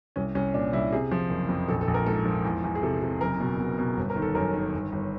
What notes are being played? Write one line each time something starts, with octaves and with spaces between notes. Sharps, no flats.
C2 C#4
C2 C#4
A#2 D4
C2 E4
C3 G#4
F3
F#1
F2
A#1 A4
A4
A#1
A#4
G#2 A4
F3
E2
E2
G#4
C3 A4
C3
F#1 A#4
B2
B2
B2
G1
A#4
D#3
A4
F#2 A#4
D#3
G1
G1